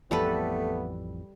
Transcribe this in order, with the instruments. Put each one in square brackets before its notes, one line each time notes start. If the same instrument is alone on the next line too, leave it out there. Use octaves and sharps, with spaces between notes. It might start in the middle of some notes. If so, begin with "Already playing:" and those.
[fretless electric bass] A1 F2 E3 [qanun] G3 A4 B4 [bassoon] A3 [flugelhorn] B3